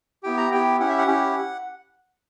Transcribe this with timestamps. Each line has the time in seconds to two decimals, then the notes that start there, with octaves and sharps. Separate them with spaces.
0.23 B3 E4 G4 G5
0.37 A#5
0.51 B3 E4 G4 G5
0.80 C#4 E4 G4 F#5
0.89 E5
0.99 F#5
1.07 C#4 E4 G4